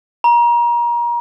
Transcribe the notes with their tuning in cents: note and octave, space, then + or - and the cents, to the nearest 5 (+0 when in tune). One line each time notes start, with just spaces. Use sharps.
A#5 +30